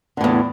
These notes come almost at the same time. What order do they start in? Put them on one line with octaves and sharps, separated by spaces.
D3 A2 E2